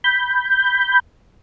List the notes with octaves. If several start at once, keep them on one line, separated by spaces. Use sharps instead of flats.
B5 G6